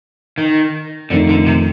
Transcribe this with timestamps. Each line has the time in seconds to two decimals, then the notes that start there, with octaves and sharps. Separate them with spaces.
0.38 D#3
1.10 F2 D3 D#3 A3 D#4
1.29 D3
1.47 C3